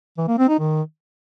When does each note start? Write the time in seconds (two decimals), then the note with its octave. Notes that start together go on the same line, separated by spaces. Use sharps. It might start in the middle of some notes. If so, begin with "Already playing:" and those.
0.17 E3
0.28 A#3
0.38 C4
0.49 D#4
0.59 D#3